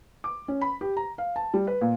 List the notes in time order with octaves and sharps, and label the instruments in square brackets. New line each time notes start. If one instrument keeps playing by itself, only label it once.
[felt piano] D6
C#4
B5
G4
A#5
F5
A5
G3
B4
A#2